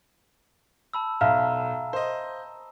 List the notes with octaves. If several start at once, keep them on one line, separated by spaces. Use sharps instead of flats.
A5 B5 E6
B1 E5 F5 A#5 F6
C5 D#5